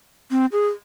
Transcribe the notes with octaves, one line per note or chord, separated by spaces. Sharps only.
C4
G#4